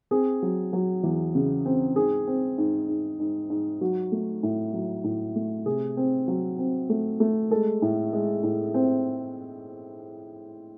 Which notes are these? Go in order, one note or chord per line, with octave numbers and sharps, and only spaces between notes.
C4 G#4
F#3
F#3
E2
C#3
C4
G#2 G#4
C4
G#2
G#2
G#2
G#2
F#3 F#4
A3
A2
F#3
A2
A3
C3 G#4
C4
F#3
C4
A3
A3
G#3 A4
A2
G#3
A2
C4